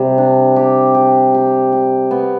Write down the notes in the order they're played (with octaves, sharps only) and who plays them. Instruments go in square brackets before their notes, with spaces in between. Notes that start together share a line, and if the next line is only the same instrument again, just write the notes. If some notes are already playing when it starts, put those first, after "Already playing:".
Already playing: [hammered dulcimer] C3 G3
D4
G4
G4
G4
G4
B3